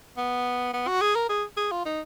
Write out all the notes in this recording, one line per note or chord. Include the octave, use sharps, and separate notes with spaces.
B3
B3
F#4
G#4
A#4
G#4
G#4
F4
D#4